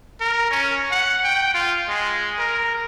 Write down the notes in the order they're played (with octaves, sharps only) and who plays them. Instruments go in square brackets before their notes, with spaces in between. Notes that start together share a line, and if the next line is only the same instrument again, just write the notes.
[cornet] A#4
C#4
F#5
G5
F4
G#3
A#4